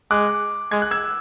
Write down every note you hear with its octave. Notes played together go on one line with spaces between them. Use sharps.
G#3 D6 F#6
G#3 G#6
F#6
E6 G#6